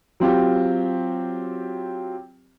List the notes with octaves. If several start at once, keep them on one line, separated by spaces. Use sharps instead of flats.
F#3 C4 F4 G4